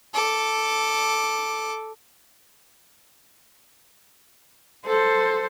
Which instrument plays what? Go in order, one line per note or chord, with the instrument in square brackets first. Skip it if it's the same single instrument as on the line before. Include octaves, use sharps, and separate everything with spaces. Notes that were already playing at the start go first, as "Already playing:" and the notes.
[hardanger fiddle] A4 D6
[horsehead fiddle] A4 C5